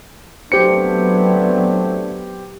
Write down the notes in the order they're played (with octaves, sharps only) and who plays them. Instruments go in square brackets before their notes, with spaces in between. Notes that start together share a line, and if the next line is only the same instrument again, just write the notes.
[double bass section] F#3 B3 [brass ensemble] A3 C4 D4 [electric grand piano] G4 C5 C#7